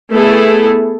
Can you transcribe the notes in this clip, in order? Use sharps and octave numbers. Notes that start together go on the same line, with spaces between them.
A3 B3 E4 G#4 A4